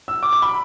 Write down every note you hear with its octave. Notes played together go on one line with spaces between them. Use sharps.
E6
D6
D6
B5